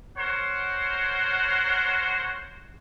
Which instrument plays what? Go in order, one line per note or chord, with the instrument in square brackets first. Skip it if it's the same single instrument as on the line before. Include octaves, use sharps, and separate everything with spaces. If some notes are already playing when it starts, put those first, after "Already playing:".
[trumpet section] A#4 C5 C#5 F#5